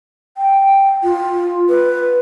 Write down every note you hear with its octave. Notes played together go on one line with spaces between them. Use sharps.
G5
F4
B4